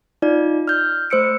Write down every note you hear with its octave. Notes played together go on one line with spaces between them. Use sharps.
D#4 F4 D5
F6 G6
A3 C5 E6 C#7 D7